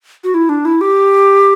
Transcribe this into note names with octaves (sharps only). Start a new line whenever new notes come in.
F#4
E4
D4
E4
G4